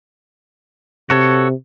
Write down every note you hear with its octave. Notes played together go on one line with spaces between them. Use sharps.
C3 F#4 A4 C#5